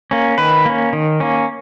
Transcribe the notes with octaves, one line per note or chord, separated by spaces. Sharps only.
A#3 C#4
D#3 B4
A#3 C#4
D#3
A#3 C#4